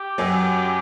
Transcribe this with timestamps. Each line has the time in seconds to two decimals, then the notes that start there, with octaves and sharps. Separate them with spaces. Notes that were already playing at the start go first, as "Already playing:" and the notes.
Already playing: G4
0.18 F#2 F#3